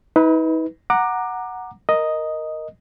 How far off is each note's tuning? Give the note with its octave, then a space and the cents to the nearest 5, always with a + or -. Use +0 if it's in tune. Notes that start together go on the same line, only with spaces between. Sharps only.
D#4 +45 B4 +0
F#5 +0 A#5 +0 D6 +20
A#4 +0 D#5 +0